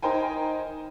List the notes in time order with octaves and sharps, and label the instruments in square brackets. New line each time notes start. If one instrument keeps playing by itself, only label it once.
[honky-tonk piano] D#4 A#4 C5 G5 G#5